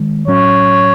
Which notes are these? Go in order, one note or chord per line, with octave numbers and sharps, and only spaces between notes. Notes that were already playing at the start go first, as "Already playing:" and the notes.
Already playing: D#3 G#3
A2 F#3 C#4 C#5